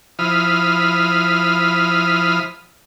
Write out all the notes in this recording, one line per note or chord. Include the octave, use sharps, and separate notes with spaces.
F3 E4 B5 D#6 F6